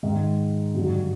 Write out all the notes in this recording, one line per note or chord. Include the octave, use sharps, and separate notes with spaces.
G#2 D#3 G#3
G2 D3 F#3